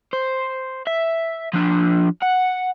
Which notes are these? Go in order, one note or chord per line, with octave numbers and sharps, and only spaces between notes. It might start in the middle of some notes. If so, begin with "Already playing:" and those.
C5
E5
F3 D4
F#5